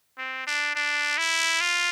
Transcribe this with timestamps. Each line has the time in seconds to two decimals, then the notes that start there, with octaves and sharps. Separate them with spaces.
0.18 C4
0.47 D4
0.75 D4
1.18 E4
1.61 F4